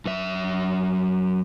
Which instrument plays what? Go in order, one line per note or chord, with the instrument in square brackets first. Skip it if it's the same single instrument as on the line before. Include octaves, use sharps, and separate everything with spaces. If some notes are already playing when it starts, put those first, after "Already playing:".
[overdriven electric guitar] F#2 E5